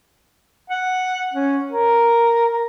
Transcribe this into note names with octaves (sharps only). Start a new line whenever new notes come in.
F#5
C#4
A#4